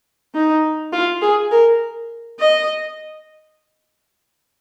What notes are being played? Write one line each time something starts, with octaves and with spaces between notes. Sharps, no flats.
D#4
F4
G#4
A#4
D#5